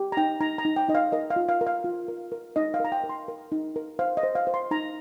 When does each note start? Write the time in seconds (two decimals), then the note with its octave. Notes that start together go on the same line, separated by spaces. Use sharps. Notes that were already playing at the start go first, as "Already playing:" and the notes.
Already playing: G4
0.12 A#5
0.17 D#4 G5
0.41 D#4 A#5
0.58 A#5
0.65 D#4
0.76 G5
0.89 D#4 D#5
0.95 F5
1.12 A#4 D#5
1.30 F5
1.36 F4
1.49 F5
1.61 A#4
1.67 F5
1.84 F4
2.08 A#4
2.32 A#4
2.56 D#4 D#5
2.74 F5
2.80 A#4 A#5
2.92 G5
3.04 A#4
3.09 C6
3.28 A#4
3.52 D#4
3.76 A#4
3.99 C5 F5
4.17 D#5
4.23 C5
4.35 F5
4.47 C5
4.54 C6
4.71 D#4 A#5